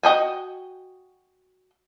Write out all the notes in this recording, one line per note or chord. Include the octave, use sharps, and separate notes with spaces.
F#4 D#5 G5 G#5